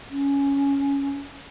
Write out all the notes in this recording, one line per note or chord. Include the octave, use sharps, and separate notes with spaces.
C#4